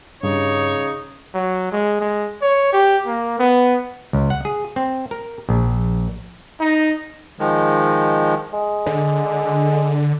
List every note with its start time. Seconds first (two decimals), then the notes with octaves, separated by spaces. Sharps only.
0.23 G2 C#3 D#4 C#5
1.34 F#3
1.72 G#3
2.00 G#3
2.42 C#5
2.73 G4
3.07 A#3
3.39 B3
4.13 C#2
4.30 F#5
4.45 G#4
4.76 C4
5.11 A#4
5.49 A#1
6.61 D#4
7.40 D#3 F3 G#3
8.53 G#3
8.86 D3